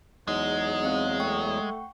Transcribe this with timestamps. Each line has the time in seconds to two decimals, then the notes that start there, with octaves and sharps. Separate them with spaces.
0.28 E2 F#3 G#3 D#4
0.83 C4 D#5 F5
1.20 A3 F#5 G5 C#6